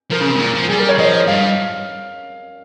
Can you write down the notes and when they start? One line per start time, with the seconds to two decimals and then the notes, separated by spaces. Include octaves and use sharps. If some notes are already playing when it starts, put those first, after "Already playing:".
0.11 F3 A#4
0.21 C#3
0.30 C3
0.36 G#2
0.40 A#2
0.55 F3
0.69 G3 G#4
0.79 A#4
0.89 C#5
0.98 F3 D#5
1.13 D#5
1.27 G2 F5